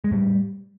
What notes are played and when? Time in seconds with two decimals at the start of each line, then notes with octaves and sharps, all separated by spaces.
0.04 G#3
0.11 A2 G3